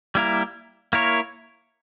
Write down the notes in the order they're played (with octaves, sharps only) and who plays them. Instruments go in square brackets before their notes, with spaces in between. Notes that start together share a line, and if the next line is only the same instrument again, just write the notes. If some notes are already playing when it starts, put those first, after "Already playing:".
[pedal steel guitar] G3 A#3 E4 A#4
A#3 E4 A#4 C#5